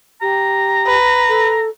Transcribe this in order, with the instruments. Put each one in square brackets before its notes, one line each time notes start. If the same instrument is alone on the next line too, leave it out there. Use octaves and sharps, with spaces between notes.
[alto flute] G4 [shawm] A#5
[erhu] B4
[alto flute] A4